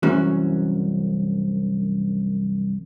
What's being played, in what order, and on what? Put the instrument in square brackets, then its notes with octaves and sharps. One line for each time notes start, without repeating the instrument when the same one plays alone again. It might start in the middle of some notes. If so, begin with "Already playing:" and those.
[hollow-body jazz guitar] C2 F#2 E3 C#4 F#4